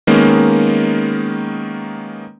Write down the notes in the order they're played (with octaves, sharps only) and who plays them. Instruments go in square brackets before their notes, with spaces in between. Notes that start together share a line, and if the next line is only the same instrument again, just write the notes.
[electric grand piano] D#3 G#3 A#3 B3 C#4